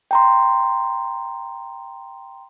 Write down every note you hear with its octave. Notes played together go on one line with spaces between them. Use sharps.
G5 A#5 C6